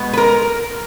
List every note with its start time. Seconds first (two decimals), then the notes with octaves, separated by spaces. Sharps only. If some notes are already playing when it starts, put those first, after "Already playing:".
Already playing: B2 G#3 B3
0.13 B4
0.17 A#4